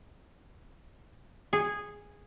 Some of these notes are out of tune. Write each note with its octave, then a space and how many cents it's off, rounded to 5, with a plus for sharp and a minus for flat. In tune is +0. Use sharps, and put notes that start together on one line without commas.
G#4 -10